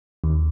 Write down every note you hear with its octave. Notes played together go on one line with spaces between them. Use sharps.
D#2